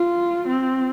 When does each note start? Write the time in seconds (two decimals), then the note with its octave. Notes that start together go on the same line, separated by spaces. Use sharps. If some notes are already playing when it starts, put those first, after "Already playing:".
Already playing: F4
0.48 C4